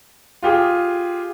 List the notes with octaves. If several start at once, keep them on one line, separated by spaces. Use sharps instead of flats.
F4 G4 G#4